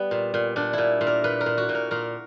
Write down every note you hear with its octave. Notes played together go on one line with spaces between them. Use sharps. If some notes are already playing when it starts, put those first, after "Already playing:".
Already playing: G3 B3
A#2
A#2
A#2 D4
A#2 E4
A#2
A#4
A#2 B4
A#4
A#2
F#4
A#2
A#4
A#2 A#4